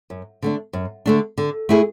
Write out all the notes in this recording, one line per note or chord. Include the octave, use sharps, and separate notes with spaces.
F#2
D3 A3 D4
F#2
D3 A3 D4
D3
A3 E4 G#4